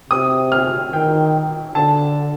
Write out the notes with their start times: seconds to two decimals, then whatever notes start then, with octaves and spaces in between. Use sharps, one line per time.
0.10 C3 D#6
0.52 F6
0.93 D#3 G5
1.75 D3 A5